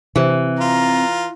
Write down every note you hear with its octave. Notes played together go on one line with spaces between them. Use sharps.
C3 E3
F4 A#5